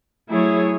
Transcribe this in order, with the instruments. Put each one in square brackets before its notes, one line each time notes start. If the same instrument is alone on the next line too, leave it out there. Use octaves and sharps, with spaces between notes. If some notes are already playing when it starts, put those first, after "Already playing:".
[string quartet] F#3 A3 E4 G#4 C#5